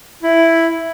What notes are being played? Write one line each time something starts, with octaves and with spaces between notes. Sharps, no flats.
E4